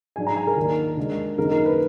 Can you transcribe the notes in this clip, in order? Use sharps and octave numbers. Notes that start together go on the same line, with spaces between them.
G#2 F#3 D4 G#5
A#5
G#5
A#4
D#2 D#3 A#3 D4
D2 D3 G#3 D4
F#2 D#3 A#3 D#4 A#4
A#4
B4